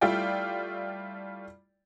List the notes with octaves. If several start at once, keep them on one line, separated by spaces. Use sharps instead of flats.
G3 A3 E4 F4 D5 G5